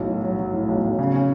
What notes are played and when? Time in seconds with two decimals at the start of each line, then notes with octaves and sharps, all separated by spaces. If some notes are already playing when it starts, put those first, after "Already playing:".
Already playing: B1 A2
0.09 F#3
0.24 F#3
0.39 F#3
0.53 A2
0.68 B1
0.84 B1
0.99 C#3
1.13 C#4